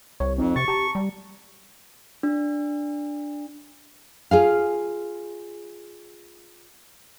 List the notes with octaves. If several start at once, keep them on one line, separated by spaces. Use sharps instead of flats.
C2 C#5
F2 C4 D#4
C3 C#6 A6
G4 A5 A#5
G3
D4
F4 G#4 F5